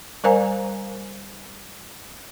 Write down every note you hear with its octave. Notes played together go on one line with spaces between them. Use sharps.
G3 A#4 C5 F5 G#5 A#5